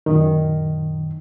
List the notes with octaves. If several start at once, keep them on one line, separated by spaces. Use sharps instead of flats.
F#2 A#2 D#3